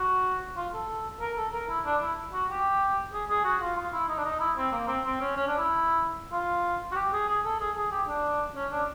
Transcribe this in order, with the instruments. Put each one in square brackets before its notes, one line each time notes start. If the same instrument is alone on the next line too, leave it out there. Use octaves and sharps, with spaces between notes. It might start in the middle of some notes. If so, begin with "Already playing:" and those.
Already playing: [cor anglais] F#4
F4
A4
A#4
A4
A#4
E4
D4
E4
F#4
G4
G#4
G#4
F#4
F4
F4
E4
D#4
D4
D#4
E4
C4
A#3
C4
C4
C#4
C#4
D4
E4
F4
F#4
G4
G#4
G#4
A4
G#4
G#4
G4
D4
C#4
D4